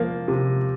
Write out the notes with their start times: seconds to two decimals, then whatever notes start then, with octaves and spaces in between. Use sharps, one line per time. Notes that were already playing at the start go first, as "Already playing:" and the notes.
Already playing: F3 A#3
0.28 C3